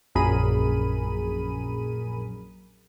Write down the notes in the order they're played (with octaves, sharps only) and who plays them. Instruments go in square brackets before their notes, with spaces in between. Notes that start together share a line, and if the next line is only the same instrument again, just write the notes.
[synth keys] A#1 F#2 G#4 A#4 B5 D#7